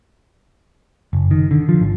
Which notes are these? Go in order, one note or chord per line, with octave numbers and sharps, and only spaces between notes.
F#1
D#3
D3
F3
G#1